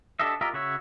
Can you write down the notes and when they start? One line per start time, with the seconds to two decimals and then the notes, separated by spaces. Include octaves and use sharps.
0.19 D4 G4 A4 D#5 E5
0.41 F4 G4 A#4 D#5 E5
0.53 C#3 F#4 C#5 E5